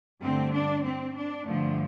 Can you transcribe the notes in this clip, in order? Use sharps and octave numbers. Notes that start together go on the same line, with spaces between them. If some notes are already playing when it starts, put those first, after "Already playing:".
G2 D3 A3 C4
D4
C4
D4
G2 D3 F3 A3